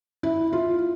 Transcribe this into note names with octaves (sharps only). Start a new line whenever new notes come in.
E4
F4